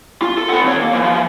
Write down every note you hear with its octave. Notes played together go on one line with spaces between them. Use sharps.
F4
A4
C4 F#5
D#2 C#5
A#3
E3 F3